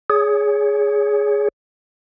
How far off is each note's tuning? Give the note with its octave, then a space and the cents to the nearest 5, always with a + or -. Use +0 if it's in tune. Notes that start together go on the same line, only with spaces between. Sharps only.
G#4 +0 C#5 +25